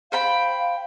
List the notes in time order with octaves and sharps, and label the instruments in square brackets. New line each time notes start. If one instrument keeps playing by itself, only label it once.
[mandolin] C5 G5 B5 [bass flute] F5